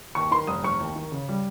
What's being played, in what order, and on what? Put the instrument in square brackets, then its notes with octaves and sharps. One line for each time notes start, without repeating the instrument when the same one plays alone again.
[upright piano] D#2 C#6
D#3 C6
F1 D#6
F1 C#6
D#2
D#3
C#3
G3